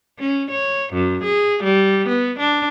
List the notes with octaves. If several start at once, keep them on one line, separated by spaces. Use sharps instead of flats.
C#4
C#5
F#2
G#4
G3
B3
D4